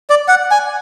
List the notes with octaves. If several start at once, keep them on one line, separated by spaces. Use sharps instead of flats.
D5
F#5
G#5